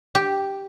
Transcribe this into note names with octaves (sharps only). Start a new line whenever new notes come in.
G4